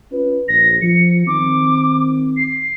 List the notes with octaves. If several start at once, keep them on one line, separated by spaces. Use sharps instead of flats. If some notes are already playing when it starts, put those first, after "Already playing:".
C#4 F4 B4
A#1 A#6
F3 C#7
D#3 C4 D6
C7